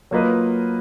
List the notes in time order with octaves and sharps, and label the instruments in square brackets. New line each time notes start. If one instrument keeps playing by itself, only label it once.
[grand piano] F#3 A#3 F4 B4 D#5